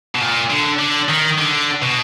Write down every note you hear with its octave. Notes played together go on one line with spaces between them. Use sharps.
B2
A#2
D3
D3
D#3
D3
B2